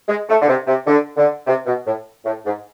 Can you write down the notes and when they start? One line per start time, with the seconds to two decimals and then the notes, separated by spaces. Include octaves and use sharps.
0.08 G#3
0.29 A3
0.41 D3
0.48 C3
0.67 C3
0.87 D3
1.17 D3
1.47 C3
1.66 B2
1.86 A2
2.25 A2
2.45 G#2